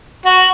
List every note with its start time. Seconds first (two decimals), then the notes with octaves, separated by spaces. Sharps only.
0.25 F#4